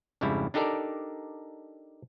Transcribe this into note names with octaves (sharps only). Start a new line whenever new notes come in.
F2 G#2 C#3 G3 E4
D4 D#4 G4 A4 A#4 D5